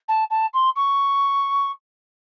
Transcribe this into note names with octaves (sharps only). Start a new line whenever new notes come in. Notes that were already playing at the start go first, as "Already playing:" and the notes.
A5
A5
C6
C#6